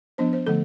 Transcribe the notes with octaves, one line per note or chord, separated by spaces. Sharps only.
F3 B3 D4 C5
C5
D3 F3 A3 A4